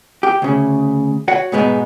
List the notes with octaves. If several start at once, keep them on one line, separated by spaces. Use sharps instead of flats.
G4
D2 C#3
F#4 C#5 F#5
G#2 B2 G#3 B3 D#4